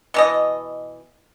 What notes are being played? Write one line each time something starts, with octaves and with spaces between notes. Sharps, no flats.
B2 E3 D#5